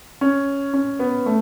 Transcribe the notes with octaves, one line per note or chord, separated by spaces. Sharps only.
C#4
C#4
B3
A3